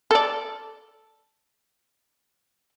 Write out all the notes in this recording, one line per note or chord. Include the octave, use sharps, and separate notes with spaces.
A4 D5